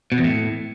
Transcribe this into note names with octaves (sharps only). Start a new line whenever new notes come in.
B2
E2
A2